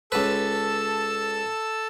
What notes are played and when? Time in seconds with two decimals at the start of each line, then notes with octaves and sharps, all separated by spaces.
0.12 C#2 A4 B4 A5 E6